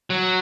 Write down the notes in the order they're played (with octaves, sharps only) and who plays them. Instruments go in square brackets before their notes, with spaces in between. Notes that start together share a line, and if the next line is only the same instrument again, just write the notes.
[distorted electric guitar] F#3